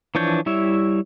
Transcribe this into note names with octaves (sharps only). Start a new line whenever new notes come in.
E3 F3 D4 C#5 G6
G3 E4 C#5 E5